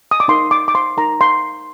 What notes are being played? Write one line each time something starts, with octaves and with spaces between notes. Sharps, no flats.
D#6
D6
D#4 A#4 C6
D6
D6
C6
D#4 A#4 A#5
C6